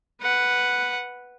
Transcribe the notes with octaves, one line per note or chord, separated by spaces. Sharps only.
B4 F#5